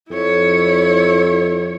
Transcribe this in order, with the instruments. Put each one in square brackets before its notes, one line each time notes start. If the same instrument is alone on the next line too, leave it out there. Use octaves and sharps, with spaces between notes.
[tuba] F2 [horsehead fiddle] E4 C#5